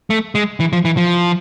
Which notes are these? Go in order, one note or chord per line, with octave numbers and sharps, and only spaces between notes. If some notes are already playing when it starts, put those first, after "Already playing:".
A3
G#3
E3
F3
E3
F3